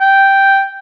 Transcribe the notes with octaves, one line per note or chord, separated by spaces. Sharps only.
G5